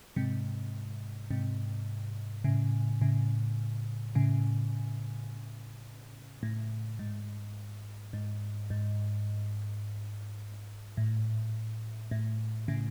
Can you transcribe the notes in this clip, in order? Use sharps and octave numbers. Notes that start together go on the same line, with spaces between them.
G#2 C3
G#2 C3
A2 C#3
A2 C#3
A2 C#3
A2
G#2
G#2
G#2
A2
A2
A2 C#3